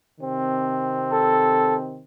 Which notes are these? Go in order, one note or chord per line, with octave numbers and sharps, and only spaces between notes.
C3 D#3 C4
A4